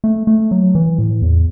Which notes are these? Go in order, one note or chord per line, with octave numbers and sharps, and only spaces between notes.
A3
A3
F#3
E3
A2
E2